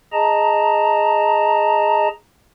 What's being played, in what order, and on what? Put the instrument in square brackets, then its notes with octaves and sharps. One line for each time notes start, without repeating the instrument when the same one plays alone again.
[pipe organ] G#4 D#5 A5 A#5